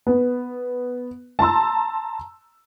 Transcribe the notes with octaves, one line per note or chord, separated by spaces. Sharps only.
B3
A5 A#5 C6 E6